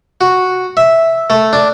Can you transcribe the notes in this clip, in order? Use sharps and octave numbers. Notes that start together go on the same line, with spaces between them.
F#4
E5
A3
D4